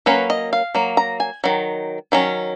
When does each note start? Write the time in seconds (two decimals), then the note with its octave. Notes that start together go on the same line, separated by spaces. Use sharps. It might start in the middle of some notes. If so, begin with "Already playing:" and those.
0.06 F#3 A#3 C#4 B4
0.30 D#5
0.53 F5
0.75 F#3 A#3
0.97 A#5
1.20 G#5
1.44 D#3 F#3
2.12 D#3 F#3 C#4